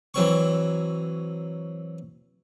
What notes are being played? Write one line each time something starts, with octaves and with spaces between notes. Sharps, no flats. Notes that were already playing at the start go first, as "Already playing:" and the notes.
E3 F#3 C4 C#6